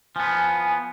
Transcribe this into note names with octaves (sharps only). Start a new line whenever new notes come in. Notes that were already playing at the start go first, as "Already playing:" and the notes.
F3 B3 G#5